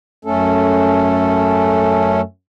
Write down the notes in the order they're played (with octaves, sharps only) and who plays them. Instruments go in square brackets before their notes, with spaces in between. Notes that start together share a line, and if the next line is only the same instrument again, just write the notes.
[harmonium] F#2 A3 C#4 A4